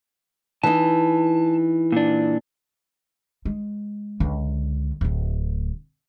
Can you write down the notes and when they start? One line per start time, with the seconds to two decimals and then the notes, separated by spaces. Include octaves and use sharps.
0.63 E3 D#4 A5
1.92 A#2 D4
3.45 G#3
4.20 C#2 D3
5.01 D1 D2